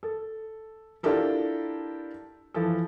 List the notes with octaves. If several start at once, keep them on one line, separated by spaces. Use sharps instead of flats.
A4
D4 E4 F4 G4 A4 A#4
E3 F3 A4